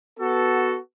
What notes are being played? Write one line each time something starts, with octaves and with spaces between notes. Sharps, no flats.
B3 F#4 A4